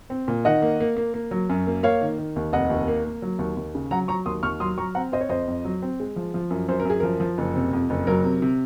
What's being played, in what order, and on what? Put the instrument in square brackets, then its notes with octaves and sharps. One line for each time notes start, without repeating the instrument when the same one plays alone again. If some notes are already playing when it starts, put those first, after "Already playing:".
[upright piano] C4
A#2
D#3 D#5 F#5
A#3
A#3
A#3
A#3
F#3
F#2
A#3
A#3 C#5 F5
D#3
D#3
D#2
F1 D#5 F#5
D#2
A#3
A#3
F#3
D#2
D#2
C#3
F#3 F#5 A#5
F#3 A#5 C#6
D#2 C6 D#6
D#2 C#6 F6
F#3 C6 D#6
F#3 A#5 C#6
C4 F#5 A#5
C4 C5 D#5
C#5
F2 C5 D#5
F2
F#3
C4
G#3
F3
F3
F#2
F#2 C5
A#4
F#2 G#4
F3 A#4
F3
F#1
C3
F2
F#1
F#3 A#4
C3
C3